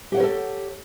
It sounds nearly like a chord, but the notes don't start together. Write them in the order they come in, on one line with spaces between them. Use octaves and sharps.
G4 F#5 C#5 A#4 A4